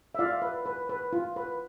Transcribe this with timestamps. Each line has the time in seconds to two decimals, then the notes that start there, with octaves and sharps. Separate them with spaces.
0.15 E5
0.19 F4 D5 F5
0.42 B4
0.66 B4
0.89 B4
1.13 F4
1.36 B4